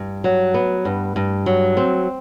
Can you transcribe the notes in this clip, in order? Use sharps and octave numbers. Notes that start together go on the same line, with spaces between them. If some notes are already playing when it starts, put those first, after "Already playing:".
Already playing: G2
F#3
B3
G2
G2
F#3
C4